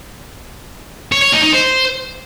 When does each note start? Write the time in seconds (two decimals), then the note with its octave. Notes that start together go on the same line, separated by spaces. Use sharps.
1.12 C#5
1.23 C#5
1.33 D#4
1.43 D#4
1.54 C5